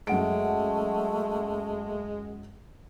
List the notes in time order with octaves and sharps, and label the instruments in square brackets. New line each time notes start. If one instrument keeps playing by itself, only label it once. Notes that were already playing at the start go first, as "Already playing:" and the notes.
[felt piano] F#2 F#5 D7 [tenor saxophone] G#3 [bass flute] A3